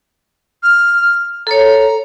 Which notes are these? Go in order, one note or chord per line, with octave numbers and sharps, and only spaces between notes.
F6
A4 C#5 A#5